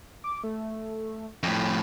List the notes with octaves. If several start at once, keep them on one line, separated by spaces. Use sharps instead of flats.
D6
A3
F2 A2